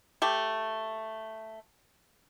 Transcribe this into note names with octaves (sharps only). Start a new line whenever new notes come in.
A3 G4